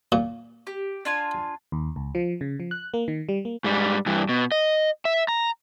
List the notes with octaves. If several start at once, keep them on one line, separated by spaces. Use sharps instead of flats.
A#2
G4
D4 F4 G#5
D#2
C#2
F3
C#3
F3
F#6
A#3
D#3
G3
A#3
G#2 G3
G2 E3
B2
D#5
E5
A#5